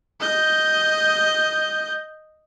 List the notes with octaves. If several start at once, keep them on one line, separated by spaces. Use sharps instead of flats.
D#5 G6